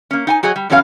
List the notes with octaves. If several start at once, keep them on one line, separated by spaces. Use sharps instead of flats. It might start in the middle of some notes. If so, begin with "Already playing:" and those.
A#3 C#4
D#4 G5 G#5
F#3 F#4 G#4 C#5 D#5
G3
B2 E3 F#3 C#4 A#4 F5